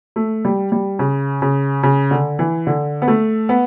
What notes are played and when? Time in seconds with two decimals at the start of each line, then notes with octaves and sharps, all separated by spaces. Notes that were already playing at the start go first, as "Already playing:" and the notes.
0.16 A3
0.45 G3
0.72 G3
0.99 C#3
1.42 C#3
1.83 C#3
2.11 D3
2.39 E3
2.67 D3
3.02 B3
3.08 A3
3.49 B3